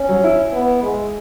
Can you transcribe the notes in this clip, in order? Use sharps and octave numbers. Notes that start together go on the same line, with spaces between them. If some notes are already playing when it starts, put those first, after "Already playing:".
Already playing: C#4
F#3
E4
B3
G#3